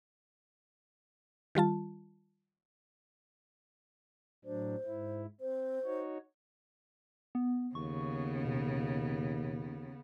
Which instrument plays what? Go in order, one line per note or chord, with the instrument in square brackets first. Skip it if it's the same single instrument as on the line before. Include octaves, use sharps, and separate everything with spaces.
[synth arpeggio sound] D#3 G3 F4 A5
[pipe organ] A2 F#3 D4 [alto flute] C5
[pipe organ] G#2 E4
[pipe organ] C4 [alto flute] C5
[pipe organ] D#4 F#4 C#5
[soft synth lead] B3
[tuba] D#2 [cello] C#3 B3 [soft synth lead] C#6
[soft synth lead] B2